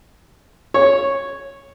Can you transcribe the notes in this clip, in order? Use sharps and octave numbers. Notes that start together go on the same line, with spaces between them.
C#5